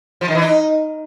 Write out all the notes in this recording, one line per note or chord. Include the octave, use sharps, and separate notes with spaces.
F3
D#3
E3
D#4